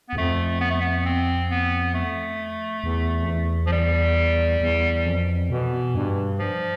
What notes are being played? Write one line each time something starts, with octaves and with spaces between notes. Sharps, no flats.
B3
E2
F2 A3
B3
A3
B3
C4
B3
A3
E2
F2
E2
F2 F3
E2 G3
E2
F2
B2 E3
G2
F3